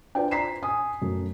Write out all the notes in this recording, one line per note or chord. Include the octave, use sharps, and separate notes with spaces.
D4 F4 B4 C5 D5 G5
A#5 B6 C7 E7
G#5 D#6
F#2 A3